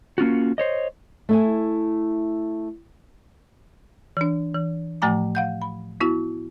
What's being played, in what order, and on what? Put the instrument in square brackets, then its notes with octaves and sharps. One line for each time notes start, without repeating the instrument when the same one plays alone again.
[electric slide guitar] A#3 C#4 F4 F#4
C5 C#5 D#5
[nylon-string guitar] A3 E4 G#5
[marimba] E3 D4
E3
A2 F3 A3 G#5 A#5 D6
F5 F#5 G6
B5
B3 E4 F#4